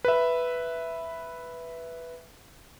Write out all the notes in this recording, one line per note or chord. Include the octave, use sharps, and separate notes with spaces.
B4 E5